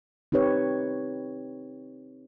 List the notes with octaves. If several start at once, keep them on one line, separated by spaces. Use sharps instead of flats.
C4 D#4 G4 B4 C#5